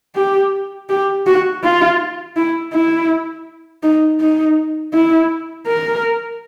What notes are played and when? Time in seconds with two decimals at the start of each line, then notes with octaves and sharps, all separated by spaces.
0.16 G4
0.89 G4
1.26 F#4
1.63 F4
2.36 E4
2.73 E4
3.83 D#4
4.20 D#4
4.93 E4
5.67 A#4